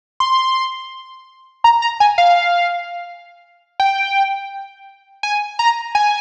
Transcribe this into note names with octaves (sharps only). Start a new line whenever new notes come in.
C6
A#5
A#5
G#5
F5
G5
G#5
A#5
G#5